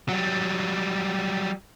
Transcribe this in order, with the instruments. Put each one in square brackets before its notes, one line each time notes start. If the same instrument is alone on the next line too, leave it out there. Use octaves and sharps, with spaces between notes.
[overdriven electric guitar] F#3 G3